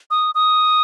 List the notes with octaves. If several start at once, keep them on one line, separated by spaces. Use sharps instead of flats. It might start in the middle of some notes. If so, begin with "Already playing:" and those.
D#6
D#6